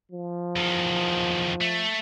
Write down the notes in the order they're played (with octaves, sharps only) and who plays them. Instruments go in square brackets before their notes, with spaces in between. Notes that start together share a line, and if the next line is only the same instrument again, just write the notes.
[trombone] F3
[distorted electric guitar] E2 D#3
A3